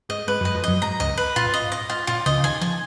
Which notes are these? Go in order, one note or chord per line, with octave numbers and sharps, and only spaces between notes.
G#2 G#3 D#5
G#2 G#3 B4
F#2 F#3 D#5
F2 F3
F#2 F#3 D#5
G#2 G#3 A#5
C#2 C#3 D#5
B4
A#2 F4
G#2
D#5
G#2
D#5
G#2 F4
A#2 F4
C#2 C#3 D#5
C#3
D#2 D#3 G#5
F3 G#5